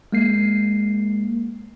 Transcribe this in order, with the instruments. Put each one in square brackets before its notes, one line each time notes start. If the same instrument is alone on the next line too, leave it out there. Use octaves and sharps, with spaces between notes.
[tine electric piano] G#3 A#3 C7